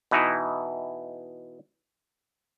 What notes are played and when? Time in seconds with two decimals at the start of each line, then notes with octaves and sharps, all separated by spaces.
0.11 B2 E3 D#4 E4